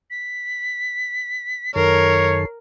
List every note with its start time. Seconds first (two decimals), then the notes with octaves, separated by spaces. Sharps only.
0.10 B6
1.76 F#2 D#3 A4 A#4 C#5 C7